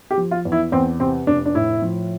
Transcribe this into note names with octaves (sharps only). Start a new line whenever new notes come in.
G4
F3
F4
E2
E4
E2 C4
C3 C4
F1 D4
D4
A2 E4
F3